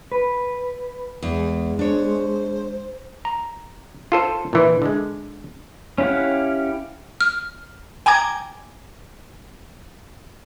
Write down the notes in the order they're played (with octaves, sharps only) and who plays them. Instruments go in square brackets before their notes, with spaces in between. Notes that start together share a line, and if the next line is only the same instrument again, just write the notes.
[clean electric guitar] B4
[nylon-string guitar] E2 [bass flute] G#3
[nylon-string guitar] D4 C#5 [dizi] C5
[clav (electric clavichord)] A#5
F4 A4 C5
A#2 E3
D3 G#3
[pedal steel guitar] C#4 E4 G4 F5 F#5
[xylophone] F6
[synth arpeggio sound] G5 G#5 A#5 D6 G#6